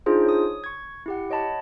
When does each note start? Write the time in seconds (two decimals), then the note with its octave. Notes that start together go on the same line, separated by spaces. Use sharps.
0.06 D4 D#4 F4 G#4 C5
0.25 C#5 D#6
0.64 C#6 G#6
1.06 E4 G4 F#5
1.31 C#5 D#5 F#5 A5 B5